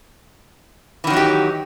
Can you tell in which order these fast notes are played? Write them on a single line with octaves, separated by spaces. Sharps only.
E3 D#3 F#3 D#4 G4